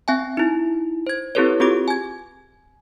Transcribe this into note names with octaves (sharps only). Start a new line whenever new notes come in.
C4 E5 G5 G#5
D#4 E4
C5 G#6
C4 E4 G4 A4 B4 C#5
C4 F4 G4 G#4 D6
G#5 G#6